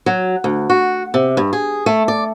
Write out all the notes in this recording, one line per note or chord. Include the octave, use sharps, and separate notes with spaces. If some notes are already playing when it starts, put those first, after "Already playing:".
F#3
D2
F#4
C3
G2
G#4
A3
D5